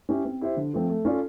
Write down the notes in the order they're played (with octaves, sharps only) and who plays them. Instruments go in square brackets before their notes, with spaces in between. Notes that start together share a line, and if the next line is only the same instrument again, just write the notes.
[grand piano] C#4 E4 G4
C4
E4 G4 C5 E5
D3
F3 A3 C4
A3
C#4 F4 A4 D5